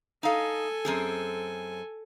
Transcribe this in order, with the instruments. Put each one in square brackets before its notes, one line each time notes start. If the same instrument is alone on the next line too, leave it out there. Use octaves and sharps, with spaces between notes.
[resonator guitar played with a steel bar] D#4 F5 [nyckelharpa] A4 G#5
[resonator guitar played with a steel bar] F#2 C4 G#4